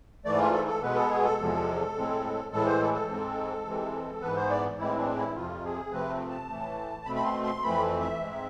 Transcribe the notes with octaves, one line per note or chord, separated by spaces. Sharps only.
G#2 E3 A3 D5
F4
A4
A4
B2 G#3 B3 B4
A4
G#4
A4
E2 C3 F3 G#3
A2 G#3 C4
A2 E3 G#3 A4
C5
A4
A4
G#2 G#3 C4
C3 E3 G#3 C4
G#2 E3 B3 B4
C5
D5
A2 E3 G#3 C4 E4
D4
E4
F2 C3 F3 F4
G#4
C3 F3 A3 C4 B4
A5
A2 E3 A3
B2 A3 C4 B5
B5
C6
C6
F2 E3 A3 C4 B5
E5
G#2 G#3 C4